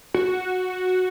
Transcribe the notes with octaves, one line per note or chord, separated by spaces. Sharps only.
F#4